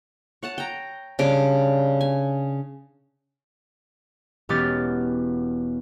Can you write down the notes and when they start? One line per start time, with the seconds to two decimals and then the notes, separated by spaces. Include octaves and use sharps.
0.43 C#5 F#5 A5
0.58 G5 A#5
1.19 C#3 G3 D4 D6
2.01 G#5
4.49 E1 B3 C#4 G4 F6 A6